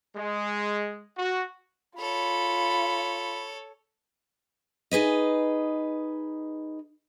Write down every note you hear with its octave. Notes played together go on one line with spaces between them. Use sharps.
G#3
F#4
F4 A4 C#5 B5
D#4 G#4 B4 D#5